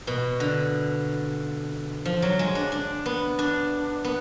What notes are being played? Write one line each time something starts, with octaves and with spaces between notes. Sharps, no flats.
B2
D3
F3
F#3
G#3
D4
D4
B3
D4
B3